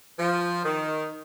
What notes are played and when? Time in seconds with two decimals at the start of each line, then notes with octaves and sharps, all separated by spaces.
0.19 F3
0.65 D#3